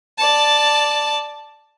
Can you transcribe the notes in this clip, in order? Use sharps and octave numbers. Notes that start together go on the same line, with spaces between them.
D5 A5